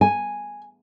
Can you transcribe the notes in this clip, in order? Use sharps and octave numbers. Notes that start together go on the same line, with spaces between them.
G#5